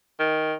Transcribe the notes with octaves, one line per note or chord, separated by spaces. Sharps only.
D#3